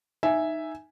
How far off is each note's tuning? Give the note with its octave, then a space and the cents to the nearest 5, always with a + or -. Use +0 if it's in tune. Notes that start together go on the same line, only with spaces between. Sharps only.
D#4 +0 E5 +0 G#5 +0